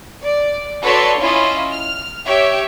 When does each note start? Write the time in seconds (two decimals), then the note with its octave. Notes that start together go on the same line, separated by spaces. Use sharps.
0.23 D5
0.82 F#4 A4 B4 C#5 D5 C6
1.19 C#4 E4 F4 D#5
1.71 F6
2.27 G4 C#5 E5